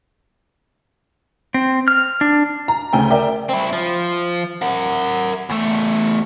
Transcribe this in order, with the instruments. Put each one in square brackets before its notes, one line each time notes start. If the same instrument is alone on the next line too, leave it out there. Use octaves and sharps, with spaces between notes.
[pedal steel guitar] C4
F6
D4
[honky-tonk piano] A#5
D2 C#3 A3 G5 G#5
A#4 D5 E5 G5
[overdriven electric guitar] C4 E4
F3
A#4 F#5
E2 A3